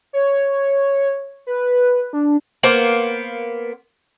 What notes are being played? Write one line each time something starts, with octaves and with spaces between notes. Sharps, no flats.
C#5
B4
D4
A#3 B3 C5